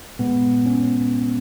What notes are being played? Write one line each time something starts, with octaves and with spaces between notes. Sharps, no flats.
A#2 G#3 B3
C#4